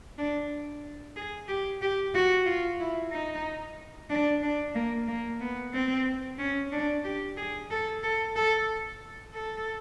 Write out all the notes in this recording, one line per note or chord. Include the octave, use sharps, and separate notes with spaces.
D4
G#4
G4
G4
F#4
F4
E4
D#4
D4
D4
A#3
A#3
B3
C4
C#4
D4
G4
G#4
A4
A4
A4
A4